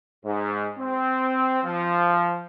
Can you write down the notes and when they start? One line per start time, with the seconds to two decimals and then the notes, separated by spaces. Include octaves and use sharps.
0.24 G#2
0.78 C4
1.64 F3